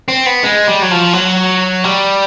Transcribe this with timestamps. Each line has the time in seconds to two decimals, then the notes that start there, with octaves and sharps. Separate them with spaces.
0.08 C4
0.26 B3
0.43 G#3
0.67 G3
0.82 F#3
0.91 F3
1.13 F#3
1.84 G3